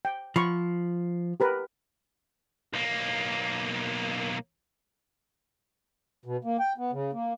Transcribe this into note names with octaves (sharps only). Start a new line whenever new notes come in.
G5
F3 B5 C#6
G4 A#4 B4
B1 A#3
B2
A#3
G5
B3
C#3
A#3